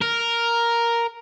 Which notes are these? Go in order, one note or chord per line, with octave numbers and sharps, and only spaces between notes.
A#4